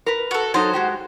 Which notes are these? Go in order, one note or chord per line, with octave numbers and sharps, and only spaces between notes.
A#4 B4
F#4 A4
F#3 D#4 A4 C5
G#3 F#4 G4